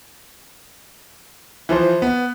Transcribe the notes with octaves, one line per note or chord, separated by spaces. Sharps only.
E3 F3 C5
B3